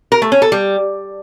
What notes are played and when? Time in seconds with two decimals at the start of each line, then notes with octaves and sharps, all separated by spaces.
0.12 A#4
0.22 A3
0.32 C#4
0.42 A4
0.52 G3